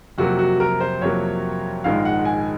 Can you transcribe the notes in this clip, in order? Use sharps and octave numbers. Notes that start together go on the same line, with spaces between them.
F2 C3 F#3 A#3 F#4
F#4
A#4
C5
F2 C3 F#3 A#3 C#5
A#1 G#2 D#3 G#3 F5
F#5
G#5